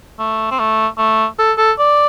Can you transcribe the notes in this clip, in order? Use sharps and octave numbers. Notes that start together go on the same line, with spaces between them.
A3
C4
A3
A3
A4
A4
D5